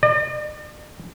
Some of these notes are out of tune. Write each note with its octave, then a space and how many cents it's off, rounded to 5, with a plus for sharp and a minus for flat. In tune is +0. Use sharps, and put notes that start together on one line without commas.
D5 +45